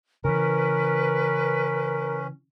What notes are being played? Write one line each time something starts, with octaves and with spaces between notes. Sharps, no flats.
C#3 E3 C#4 A#4 B4